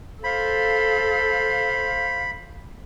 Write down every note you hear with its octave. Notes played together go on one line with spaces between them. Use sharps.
A4 C5 F5 B5